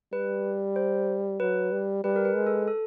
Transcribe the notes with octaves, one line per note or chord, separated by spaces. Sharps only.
G3 B4
C5
F#3 B4
G3
G3 B4
A#4
B4
G#3
A4
A4